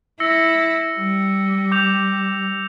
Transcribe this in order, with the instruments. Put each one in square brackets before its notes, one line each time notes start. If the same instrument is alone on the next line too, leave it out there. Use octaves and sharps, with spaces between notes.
[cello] E4 [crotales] E6 A#6 C#7
[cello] G3
[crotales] D6 G6 F7